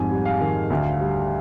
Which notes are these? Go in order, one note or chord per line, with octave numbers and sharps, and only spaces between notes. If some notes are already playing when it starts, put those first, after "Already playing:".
Already playing: F2 G#2 G3 G#5
G3
F5
D#3
D2
G3